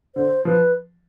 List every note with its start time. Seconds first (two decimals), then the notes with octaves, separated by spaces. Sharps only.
0.15 D3 C5
0.45 F3 B4